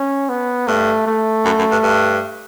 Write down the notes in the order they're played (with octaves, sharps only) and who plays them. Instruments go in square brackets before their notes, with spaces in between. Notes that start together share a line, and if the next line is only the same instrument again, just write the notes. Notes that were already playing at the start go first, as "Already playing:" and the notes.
Already playing: [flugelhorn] C#4
B3
[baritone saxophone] G2 [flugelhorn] A3
[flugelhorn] A3
[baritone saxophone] F#2
F#2
G2
G2